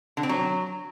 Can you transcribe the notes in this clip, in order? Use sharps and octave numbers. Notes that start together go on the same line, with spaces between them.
D3
C4
F#3